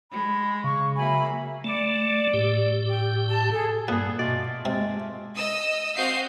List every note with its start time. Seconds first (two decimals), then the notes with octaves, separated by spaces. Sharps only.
0.12 G#3 B5
0.64 C#3 C#6
0.96 F#3 A#3 E5 G#5 B5
1.64 A3 D5
2.34 A2 G4
2.90 G5
3.28 A5
3.51 G#4 A4
3.88 G2 A#2 B3 G#4 F#6
4.19 B2 A3 F4 F#4 D5 D#5
4.65 C3 G#3 E5
5.36 D#5 D#6 E6
5.95 C4 F#4 F5 D#6 G6 C7